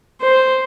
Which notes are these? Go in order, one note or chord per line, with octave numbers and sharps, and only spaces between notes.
C5